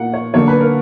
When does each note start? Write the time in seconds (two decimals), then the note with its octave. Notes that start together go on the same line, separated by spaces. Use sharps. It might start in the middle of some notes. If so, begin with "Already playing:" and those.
Already playing: A#2 A#3 F#5
0.14 C#5
0.34 D3 F#3 A#3 C#5
0.48 B4
0.60 A#4